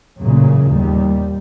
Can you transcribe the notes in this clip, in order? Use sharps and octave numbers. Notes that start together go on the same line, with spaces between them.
A1 F#2 A#2 C#3
D#2 G3